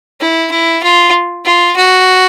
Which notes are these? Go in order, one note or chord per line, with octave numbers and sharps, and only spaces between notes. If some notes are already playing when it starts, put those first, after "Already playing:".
E4
E4
F4
F4
F#4